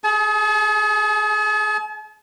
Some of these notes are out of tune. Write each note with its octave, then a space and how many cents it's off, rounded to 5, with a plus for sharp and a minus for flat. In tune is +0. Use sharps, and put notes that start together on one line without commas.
G#4 +25 A5 -45